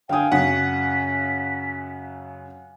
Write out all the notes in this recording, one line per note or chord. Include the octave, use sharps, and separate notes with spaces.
D3 F5 G5 G#5 D#6
F#2 C#3 F#5 B6